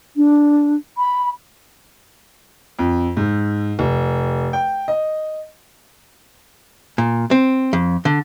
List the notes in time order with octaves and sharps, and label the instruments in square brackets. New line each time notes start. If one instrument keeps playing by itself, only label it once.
[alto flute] D4
B5
[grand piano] F2
G#2
F1
G5
D#5
[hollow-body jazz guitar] A#2
C4
F2
D3